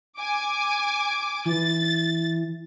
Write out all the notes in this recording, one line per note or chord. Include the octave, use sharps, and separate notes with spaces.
G#5 D6
E3 A6